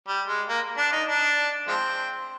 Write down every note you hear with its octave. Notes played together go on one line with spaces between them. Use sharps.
G3
G#3
A#3
D4
D#4
D4
F3 G#3 C4